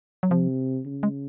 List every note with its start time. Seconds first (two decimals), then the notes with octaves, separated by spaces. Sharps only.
0.23 F#3
0.31 C3 F3
0.85 C#3
1.03 G#3